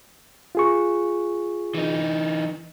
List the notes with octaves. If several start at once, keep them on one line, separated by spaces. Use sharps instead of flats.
F4 G#4 C#6
E3 D#4